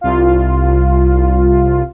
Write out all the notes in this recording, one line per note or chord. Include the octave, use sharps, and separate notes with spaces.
C2 F4